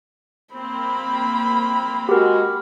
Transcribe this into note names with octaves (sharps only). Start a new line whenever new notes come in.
A#3 C4 B5
G#3 F#4 G4 A#4